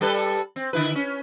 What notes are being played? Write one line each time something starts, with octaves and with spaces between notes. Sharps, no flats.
G3 A4 B4
C4
D3 E4 B4
C#4